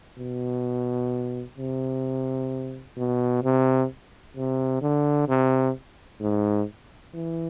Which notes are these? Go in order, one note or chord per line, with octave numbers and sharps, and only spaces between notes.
B2
C3
B2
C3
C3
D3
C3
G#2
E3